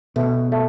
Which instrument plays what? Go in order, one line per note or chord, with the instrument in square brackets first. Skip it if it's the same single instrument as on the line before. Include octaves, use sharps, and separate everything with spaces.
[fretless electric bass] B2 [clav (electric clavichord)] A3
[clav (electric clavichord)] A3